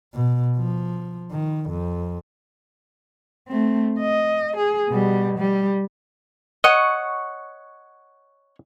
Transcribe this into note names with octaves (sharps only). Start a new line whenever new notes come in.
B2
F3
D#3
F2
A3 C4
D#5
G#4
B2 G3
G3
C#5 D#5 F#5 C#6